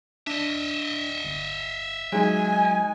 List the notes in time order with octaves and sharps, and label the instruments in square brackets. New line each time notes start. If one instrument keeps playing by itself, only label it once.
[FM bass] D4 [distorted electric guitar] D#5 E5
[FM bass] G1
[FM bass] F#3 [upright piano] G#3 D#4 [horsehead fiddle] G#5